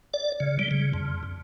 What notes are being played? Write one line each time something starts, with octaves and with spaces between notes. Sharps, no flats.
D5
C#3
G3
C#3
F2